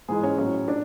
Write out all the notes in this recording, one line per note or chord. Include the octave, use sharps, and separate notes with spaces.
G#2 E3 G#3 G#4
C#4
A2 F#3 C#4
D4